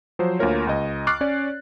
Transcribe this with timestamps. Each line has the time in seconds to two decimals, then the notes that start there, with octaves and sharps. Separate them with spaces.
0.19 F3 F#3 C5
0.39 D2 A#3 F4 A#4 C#5
0.67 C#2 D#5
1.07 C#6 D6 F6 F#6 A6 C7
1.21 C#4 C#5 D5